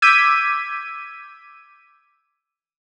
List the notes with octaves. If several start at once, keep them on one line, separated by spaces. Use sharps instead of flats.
D6 E6 G6 G#6 B6 D#7